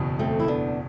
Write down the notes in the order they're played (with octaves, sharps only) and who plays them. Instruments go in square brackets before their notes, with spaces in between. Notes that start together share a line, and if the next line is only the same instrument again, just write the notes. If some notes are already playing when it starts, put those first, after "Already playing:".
Already playing: [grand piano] F#1 E2 B2
[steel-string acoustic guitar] A3 C4
E4
B3 D4